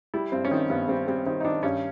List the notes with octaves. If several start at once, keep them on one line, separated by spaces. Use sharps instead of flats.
G3 E4
G2 C4
C#4
D#3 C4
G2 B3
G3 C4
G3 C4
D#3 C4
D#4
D#3 D4
G2 C#4